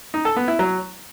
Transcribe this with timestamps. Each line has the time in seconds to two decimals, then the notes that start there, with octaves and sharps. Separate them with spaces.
0.14 D#4
0.25 A4
0.37 B3
0.48 E4
0.59 F#3